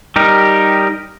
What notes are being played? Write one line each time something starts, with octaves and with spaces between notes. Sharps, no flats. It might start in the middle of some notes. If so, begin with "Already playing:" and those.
G3 D#4 G4 A#4